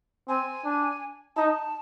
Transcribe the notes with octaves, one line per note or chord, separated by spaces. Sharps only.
C4 G#5
D4
D#4 A5